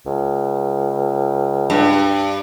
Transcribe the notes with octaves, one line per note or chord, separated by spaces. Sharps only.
C#2
G2